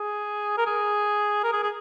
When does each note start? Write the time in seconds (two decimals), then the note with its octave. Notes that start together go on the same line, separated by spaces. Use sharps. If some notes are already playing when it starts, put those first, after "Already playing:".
Already playing: G#4
0.57 A#4
0.66 G#4
1.44 A#4
1.53 G#4
1.63 G#4